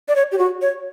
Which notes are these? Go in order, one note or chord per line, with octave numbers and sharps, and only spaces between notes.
D5
C#5
G4
F#4
C#5